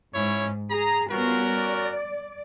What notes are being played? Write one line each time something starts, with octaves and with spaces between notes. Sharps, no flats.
G#2 C#4 E4 C#5
G#4 A#5
G3 B3 C#4 F4 F#4 A#4
D5